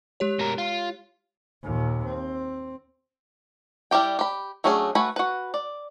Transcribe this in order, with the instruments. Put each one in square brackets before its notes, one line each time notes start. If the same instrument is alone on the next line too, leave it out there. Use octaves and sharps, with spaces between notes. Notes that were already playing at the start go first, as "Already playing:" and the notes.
[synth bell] G#3 G4 C#5
[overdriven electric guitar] B2 A#4
F4
[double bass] D#2 A#2
C4
[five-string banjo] G3 E4 G4 G5
G4 B5
F#3 A3 C#4 D4 G#4
A3 F#4 B4 G#5 B5
F#4 B4
D5